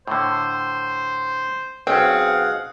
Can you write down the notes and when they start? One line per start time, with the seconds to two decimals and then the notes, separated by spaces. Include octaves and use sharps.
0.07 A2 D3 C5
1.87 B1 C4 C#4 G#4 F5 F#5